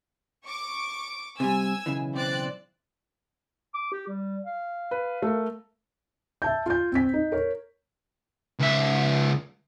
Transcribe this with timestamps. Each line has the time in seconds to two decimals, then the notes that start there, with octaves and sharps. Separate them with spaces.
0.46 C#6 D6 D7
1.40 C3 G3 G#5 E6
1.86 B1 C#3 E3
2.14 C4 D5 F#6
3.74 D6
3.93 G4
4.08 G3
4.46 F5
4.91 B4
5.22 A3 A#4
6.42 E5 A5 G6
6.66 F4 G6
6.92 C4 B6
7.13 D#4
7.32 A#4 C#5
8.59 C#2 E5